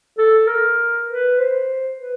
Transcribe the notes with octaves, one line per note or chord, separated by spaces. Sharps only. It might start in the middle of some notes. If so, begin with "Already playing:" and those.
A4
A#4
B4
C5
B4